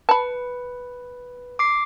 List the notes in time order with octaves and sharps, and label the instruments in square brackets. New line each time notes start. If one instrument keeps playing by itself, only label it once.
[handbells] B4 [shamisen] A5 B5
[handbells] D6 C7